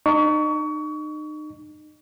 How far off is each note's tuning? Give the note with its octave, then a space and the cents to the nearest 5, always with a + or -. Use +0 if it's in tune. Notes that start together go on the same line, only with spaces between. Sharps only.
D#4 -35 C#6 +30